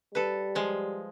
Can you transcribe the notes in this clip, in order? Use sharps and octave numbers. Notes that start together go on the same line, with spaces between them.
G3 A4 B4
F3 G#3